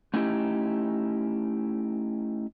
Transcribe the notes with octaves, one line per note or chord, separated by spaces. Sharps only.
A3 C#4 D#4 E4 G4